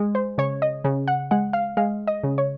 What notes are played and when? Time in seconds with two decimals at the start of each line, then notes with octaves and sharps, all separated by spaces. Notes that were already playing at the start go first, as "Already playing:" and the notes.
Already playing: G#3
0.15 C5
0.38 C#3 C#5
0.62 D#5
0.84 C#3
1.08 F#5
1.31 G#3 F#5
1.53 F5
1.77 G#3 F5
2.07 D#5
2.24 C#3
2.38 C#5